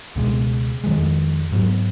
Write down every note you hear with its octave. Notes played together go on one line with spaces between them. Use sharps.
C#2 B2 G#3
F2 D#3 G#3
G#2 F#3 B3